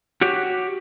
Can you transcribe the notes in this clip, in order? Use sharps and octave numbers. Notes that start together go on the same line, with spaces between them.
F#4 G4 C#5